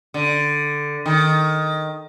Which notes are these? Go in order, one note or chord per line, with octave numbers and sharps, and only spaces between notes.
D3
D#3